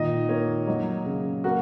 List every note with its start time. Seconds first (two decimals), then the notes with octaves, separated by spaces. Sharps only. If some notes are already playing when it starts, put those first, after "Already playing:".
Already playing: A#2 D#3 D#5
0.29 A#3 C#5
0.67 F#3 D#5
1.06 C#3
1.44 A#3 F#4